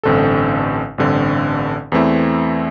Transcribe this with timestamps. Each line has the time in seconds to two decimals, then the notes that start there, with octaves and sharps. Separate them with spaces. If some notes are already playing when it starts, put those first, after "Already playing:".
0.03 A1 G2 D3 C4 A4
0.98 A1 G2 D3 C4 A4
1.92 E2 E3 A3 C4 E4